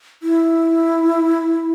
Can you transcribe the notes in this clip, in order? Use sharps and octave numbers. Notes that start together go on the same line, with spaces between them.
E4